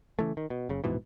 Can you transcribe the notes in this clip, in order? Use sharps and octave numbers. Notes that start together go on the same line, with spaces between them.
C#3 E3 A3
D#3
B2
F#1 C#3
D#1 G#2 B2 E3